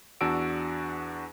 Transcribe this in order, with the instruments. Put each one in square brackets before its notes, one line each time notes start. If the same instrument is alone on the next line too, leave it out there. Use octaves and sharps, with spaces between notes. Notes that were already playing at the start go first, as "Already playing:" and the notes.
[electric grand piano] E2 D4 F#4 A5 E6 D7